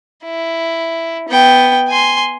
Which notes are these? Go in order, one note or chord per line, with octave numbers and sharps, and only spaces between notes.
E4
B3 G5
G#5 C6